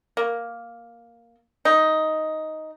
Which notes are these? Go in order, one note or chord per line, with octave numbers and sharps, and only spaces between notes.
A#3
D#4